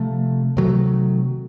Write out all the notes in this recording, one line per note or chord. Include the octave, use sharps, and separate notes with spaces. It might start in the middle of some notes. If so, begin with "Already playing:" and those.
Already playing: C3 F3 A3
C3 D#3 F#3 A3